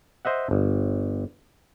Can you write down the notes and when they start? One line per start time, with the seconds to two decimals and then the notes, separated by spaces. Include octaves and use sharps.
0.25 C5 D#5 E5 F#5
0.51 G1